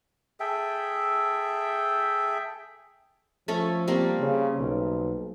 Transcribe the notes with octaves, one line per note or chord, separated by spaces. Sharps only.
G#4 A4 E5 G5
F3 A3 C#4 A4
G3 A#3 C4
C#3
B1